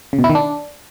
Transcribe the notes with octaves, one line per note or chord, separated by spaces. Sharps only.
C#3
B2
E4
D#3
D4